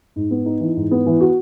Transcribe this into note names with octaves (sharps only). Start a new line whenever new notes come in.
G#2
B3
D#4
E3
G#2
B3
E3
F#4